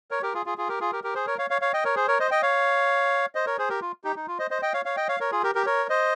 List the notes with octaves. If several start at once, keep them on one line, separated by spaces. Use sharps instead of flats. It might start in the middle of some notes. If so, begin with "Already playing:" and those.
A#4 C#5
G4 A#4
F4 G#4
F4 G#4
F4 G#4
G4 A#4
F4 G#4
G4 A#4
G4 A#4
G#4 C5
A#4 C#5
C#5 F5
C#5 F5
C#5 F5
D#5 G5
A#4 C#5
G#4 C5
A#4 C#5
C5 D#5
D#5 G5
C#5 F5
C5 D#5
A#4 C#5
G#4 C5
G4 A#4
F4
D#4 G4
D#4
F4
C5 D#5
C5 D#5
D#5 G5
C#5 F5
C#5 F5
D#5 G5
C#5 F5
A#4 C#5
F4 G#4
G4 A#4
G4 A#4
A#4 C#5
C5 D#5